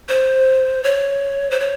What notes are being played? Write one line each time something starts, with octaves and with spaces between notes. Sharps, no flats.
C5
C#5
C5
C#5